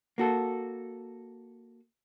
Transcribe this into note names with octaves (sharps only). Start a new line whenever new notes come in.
A#3 F#4 A4